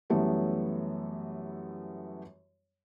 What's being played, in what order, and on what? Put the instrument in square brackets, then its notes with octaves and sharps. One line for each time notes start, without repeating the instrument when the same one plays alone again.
[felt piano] F#2 E3 G3 A3 B3 C#4